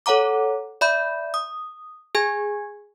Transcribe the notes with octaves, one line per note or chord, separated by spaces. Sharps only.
A4 C#5 F#5 A#5 D6
D5 E5 B5 G6
D#6
G#4 G#5 G#6